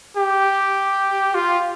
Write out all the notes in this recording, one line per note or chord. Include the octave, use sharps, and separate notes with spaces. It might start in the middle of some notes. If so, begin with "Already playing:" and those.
G4
F4